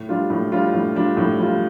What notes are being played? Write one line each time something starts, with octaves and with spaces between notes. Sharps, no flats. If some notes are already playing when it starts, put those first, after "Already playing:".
Already playing: A2
G3 D4 F4
A2
G3 D4 F4
A2
G3 D4 F4
A2
G3 D4 F4